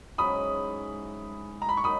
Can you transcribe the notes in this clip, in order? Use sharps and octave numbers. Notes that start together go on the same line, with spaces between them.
G#2 F#3 C#4 E4 B5 D#6
A#5
B5
C#6
D#3 F#3 B5 D#6